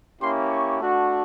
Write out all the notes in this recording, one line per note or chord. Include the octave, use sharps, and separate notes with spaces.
A#3 C#4 E4 G4 C6
C#6
A3 D4 F#4